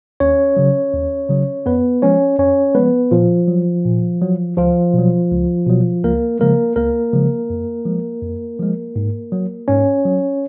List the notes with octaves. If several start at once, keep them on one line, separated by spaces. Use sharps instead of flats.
D#2 C#4 C#5
C#3 F#3
D#2
C#3 F#3
F2 B3 B4
F3 G#3 C#4 C#5
F2 C#4 C#5
F3 G#3 B3 B4
A#2 F3 F4
F#3
A#2
F#3
C#2 F3 F4
B2 F#3
C#2
B2 F#3
C#2 A#3 A#4
C#3 F3 G#3 A#3 A#4
C#2 A#3 A#4
C#3 F3 G#3
F2
F3 G#3
F2
F3 G#3
G#2
F#3
G#2 C#4 C#5
F#3